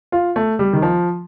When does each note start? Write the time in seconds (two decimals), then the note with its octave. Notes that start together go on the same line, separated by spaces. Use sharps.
0.12 F4
0.36 A3
0.59 G3
0.73 D#3
0.82 F3